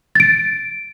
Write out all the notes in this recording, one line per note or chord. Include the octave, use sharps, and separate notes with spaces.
A6 D7